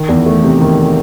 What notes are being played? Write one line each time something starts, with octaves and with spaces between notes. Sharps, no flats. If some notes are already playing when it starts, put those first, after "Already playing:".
Already playing: D#3
E2
A3
C3
D#3